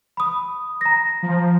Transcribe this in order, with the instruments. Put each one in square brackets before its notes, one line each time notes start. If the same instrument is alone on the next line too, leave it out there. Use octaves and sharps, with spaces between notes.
[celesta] B5 D#6
A#5 A#6
[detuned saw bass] F3